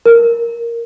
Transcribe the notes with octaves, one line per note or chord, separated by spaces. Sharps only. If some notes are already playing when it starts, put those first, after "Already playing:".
A#4